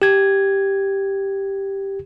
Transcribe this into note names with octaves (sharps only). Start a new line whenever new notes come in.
G4 G#6